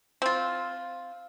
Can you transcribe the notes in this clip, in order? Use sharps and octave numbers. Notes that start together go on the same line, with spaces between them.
C4 F4